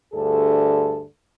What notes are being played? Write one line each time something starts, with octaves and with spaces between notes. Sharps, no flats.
D2 G2 D3 G#4 A4